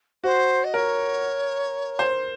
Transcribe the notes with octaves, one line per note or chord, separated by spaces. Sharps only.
F#4 C5
D#5
A#4 C#5
C5